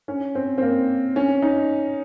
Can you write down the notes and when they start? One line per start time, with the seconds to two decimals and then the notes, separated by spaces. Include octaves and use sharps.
0.08 C#4
0.35 C4
0.58 C4
0.62 A#3
1.16 C#4
1.42 D#4